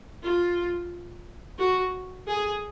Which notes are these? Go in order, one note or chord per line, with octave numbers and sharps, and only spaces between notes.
F4
F#4
G#4